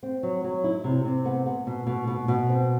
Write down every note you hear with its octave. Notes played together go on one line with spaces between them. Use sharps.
C4
F#3
F#3
E4
C3
C3
B3
B3
B2
B2
B2
B2
C4